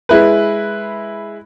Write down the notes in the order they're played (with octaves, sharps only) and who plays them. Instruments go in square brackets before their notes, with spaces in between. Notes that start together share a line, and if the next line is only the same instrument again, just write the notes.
[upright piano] G#3 E4 B4